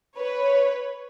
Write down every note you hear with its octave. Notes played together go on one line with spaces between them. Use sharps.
B4 C#5